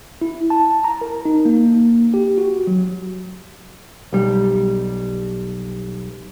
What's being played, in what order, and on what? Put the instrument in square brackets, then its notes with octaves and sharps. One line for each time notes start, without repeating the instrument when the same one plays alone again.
[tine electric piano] E4
A5
A#5
A#4
D#4
A#3
G4
F#4
F#3
[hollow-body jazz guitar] B1 G3